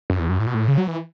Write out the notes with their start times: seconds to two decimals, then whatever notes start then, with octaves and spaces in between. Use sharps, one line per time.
0.10 F#2
0.19 E2
0.29 F#2
0.39 A2
0.46 B2
0.54 A2
0.68 C#3
0.78 F#3
0.87 E3